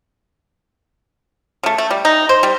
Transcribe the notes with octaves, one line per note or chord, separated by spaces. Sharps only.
C#3 A3
A3
G3
D#4
C5
G3